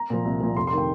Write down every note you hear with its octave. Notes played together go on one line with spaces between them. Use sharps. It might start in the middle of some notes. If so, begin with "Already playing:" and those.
Already playing: A#5
A#2 F3
C2
A#2 F3
F1 C6
C6
D#3 G5